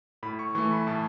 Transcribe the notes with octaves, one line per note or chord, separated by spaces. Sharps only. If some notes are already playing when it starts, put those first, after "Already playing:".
A2 B5
C#6
E3 A3 C#6
B5
A2 A5